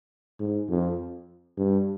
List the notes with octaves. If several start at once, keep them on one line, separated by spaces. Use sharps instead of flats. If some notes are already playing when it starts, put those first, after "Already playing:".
G#2
F2
G2